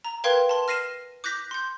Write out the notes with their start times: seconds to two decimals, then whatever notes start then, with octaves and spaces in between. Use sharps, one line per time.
0.05 A#5
0.24 A#4 B4 F5 G5 C6 G#6
0.49 A5 C6
0.68 F6 A#6 C7 D#7 E7
1.24 D6 F#6 G6 A#6 B6
1.51 C6 G6